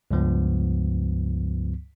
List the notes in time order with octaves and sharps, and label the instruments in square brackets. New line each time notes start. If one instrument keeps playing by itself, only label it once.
[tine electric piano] C#2 G2 F3 B3